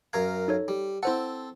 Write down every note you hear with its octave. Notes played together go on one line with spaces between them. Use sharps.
F#2 A#4 F5 G#6
D#4 A4 C#5
G3
C4 E4 A4 C5 F#5